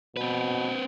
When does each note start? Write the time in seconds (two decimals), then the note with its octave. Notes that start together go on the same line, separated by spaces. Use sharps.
0.17 B2 C4 B4